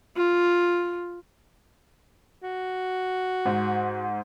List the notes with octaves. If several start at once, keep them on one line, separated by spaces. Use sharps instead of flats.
F4
F#4
G#2